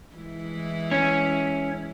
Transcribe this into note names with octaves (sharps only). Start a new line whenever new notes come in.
E3 G#3 E4
C#4